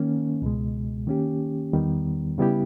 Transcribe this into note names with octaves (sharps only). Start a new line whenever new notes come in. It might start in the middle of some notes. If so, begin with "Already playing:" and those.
Already playing: D#3 A#3 C#4
C#2 B2 G#3
D#3 A#3 C#4 G4
E2 D#3 G3 B3
C#3 G3 B3 E4 G4